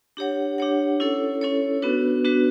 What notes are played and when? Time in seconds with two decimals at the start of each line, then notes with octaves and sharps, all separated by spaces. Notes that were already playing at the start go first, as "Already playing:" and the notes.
0.17 D4 G4 C#5 F#5
0.58 D4 G4 C#5 F#5
1.00 C#4 E4 A4 C#5
1.41 C#4 E4 A4 C#5
1.82 B3 D4 F#4 B4
2.24 B3 D4 F#4 B4